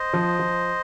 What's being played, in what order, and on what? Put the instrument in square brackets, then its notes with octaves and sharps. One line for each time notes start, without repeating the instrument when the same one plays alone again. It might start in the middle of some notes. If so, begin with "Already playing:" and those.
Already playing: [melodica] C5 D#5
[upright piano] F3
F3